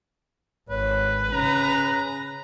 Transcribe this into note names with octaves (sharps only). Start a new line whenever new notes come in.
G#1 B4 C#5
C#3 C#4 A#5